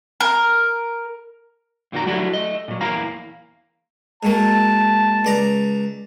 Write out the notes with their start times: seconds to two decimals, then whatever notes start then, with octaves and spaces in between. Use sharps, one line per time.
0.20 A#4
1.92 F2 A#2 D#3 F#4 A#5
2.06 F#3 A3 D4 E4 F#4 G4
2.33 A3 D#5
2.68 A#2 F#3
2.81 E2 A#3 E4 F5 A#5
4.23 G#2 F#3 A#3 A5
5.25 C#2 D5 A#5